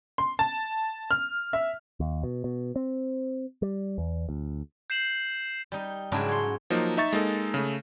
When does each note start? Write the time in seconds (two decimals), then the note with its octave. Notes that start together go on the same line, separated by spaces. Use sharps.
0.18 C6
0.39 A5
1.11 F6
1.53 E5
2.00 D#2
2.23 B2
2.44 B2
2.76 C4
3.62 G3
3.98 E2
4.29 D2
4.90 G6 C7 E7 F#7
5.72 G3 D#4
6.12 G#2 C#3 F#3 D4 E4
6.29 C#5 C6
6.70 F3 F#3 A#3 D#4
6.97 D#4 E5 C#6 A6
7.13 G#3 A#3 D#4 A4
7.54 C#3 A3